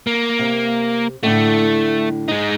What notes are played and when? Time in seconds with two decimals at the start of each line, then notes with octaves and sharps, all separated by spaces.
0.07 A#3
0.39 C3
1.23 A2 D3 A3
2.28 G#3 D#4